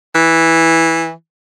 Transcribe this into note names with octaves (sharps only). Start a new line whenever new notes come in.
E3